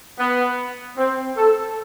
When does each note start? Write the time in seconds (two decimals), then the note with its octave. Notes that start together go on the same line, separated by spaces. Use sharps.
0.19 B3
0.98 C4
1.37 A4